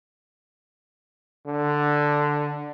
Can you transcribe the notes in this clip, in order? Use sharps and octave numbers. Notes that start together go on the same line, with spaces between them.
D3